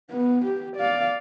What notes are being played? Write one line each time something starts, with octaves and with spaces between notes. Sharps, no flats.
B3
G4
D5 F5